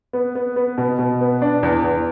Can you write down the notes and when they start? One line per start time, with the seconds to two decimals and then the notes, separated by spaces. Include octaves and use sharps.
0.13 B3
0.35 B3
0.56 B3
0.78 B2
0.99 B2
1.21 B3
1.42 D4
1.63 E2
1.84 E2